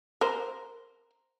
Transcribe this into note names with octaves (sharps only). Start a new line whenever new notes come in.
A#4 C5